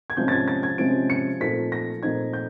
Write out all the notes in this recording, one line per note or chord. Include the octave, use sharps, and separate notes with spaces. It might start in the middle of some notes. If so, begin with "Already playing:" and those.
G#6
C3 F3 G#3 C#4 G6
A6
G#6
A6
G#6
C3 F3 G#3 C#4 D7
C#7
A#2 F3 A3 C4 D#4 B6
A#6
A#2 F3 A3 C4 D#4 G#6
G6